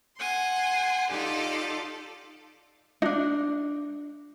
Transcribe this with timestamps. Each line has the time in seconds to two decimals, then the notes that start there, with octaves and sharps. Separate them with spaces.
0.18 F#5 G#5 C6
1.10 D#4 F4 G4 A4 D5
3.02 D4 D#4